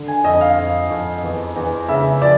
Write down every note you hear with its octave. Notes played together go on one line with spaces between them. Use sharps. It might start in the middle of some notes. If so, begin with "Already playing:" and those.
Already playing: D3
G#5
F2 D#5
F5
F2
F2
E2
E2
C#3 E5
F3 D5